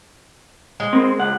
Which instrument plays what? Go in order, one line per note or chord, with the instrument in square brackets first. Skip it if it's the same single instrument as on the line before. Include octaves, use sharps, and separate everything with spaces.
[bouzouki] G#3
[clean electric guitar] C4 A#4 C5
C#2 F#5